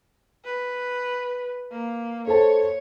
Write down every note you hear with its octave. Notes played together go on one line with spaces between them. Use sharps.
B4
A#3
A4 C5 C#5 A5